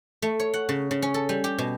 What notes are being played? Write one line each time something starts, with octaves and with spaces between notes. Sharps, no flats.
A3
C#5
F#5
C#3
C#3
C#4
A4
G3
G4
B2